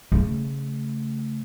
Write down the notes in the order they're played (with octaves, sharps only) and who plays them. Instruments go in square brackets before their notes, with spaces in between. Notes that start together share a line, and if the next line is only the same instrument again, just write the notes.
[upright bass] C#3 A3